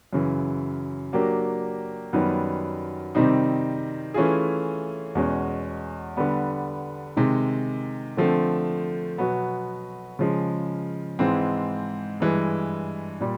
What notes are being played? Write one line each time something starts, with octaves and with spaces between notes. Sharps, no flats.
F#2 C#3 E3
F#3 A#3 D4 G4 A#4
F#2 D#3 G3 B3
C3 D#3 G3 C4 D#4
E3 A3 C#4 F4 G#4
E2 B2 G#3 C#4
D3 G3 B3
C3 D#3 G#3
D3 F3 A3 C4
B2 F#3 B3
C#3 F3 G#3
G#2 E3 G#3 C4
G2 E3 G#3
A#2 G3